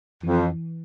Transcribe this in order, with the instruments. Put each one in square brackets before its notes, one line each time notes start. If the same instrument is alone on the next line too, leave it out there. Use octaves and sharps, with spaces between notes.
[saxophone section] F2 [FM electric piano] E3